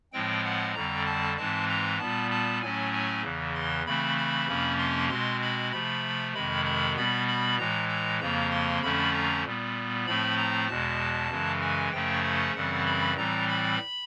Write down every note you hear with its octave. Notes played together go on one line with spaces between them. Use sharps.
A2 F3 G#3 C4 G5
F#5
F2 D3 G3 C4 A#5
A5
G#2 E3 G#3 C4 A5
A#5
A#2 G3 B3 A5
A5
A2 F#3 A3 C#4 G#5
G#5
E2 C#3 E3
C6
C#3 E3 A3 C4 B5
B5
F2 C3 F3 A#3 C#4
C6
B2 G#3 C4 C6
B5
C3 F3 A3 B5
F2 C3 D#3 G#3 B5
B5
B2 G3 B3 B5
B5
A2 E3 G#3 A#5
A#5
F2 C#3 F3 A#3 A#5
C6
F2 D3 F3 A3 C#4 B5
A#5
A#2 G3 B3
A2 F3 A3 C4 B5
A#5
E2 B2 G#3 A5
F#2 C#3 E3 G#3
G#5
F#2 C#3 F3 A3 C#4 G5
F#5
F#2 C#3 E3 G3 C4 F#5
B5
A2 E3 G3 C4 A#5
B5